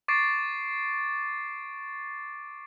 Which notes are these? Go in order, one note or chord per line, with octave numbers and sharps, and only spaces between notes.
C#6 D6 A6 C7 D7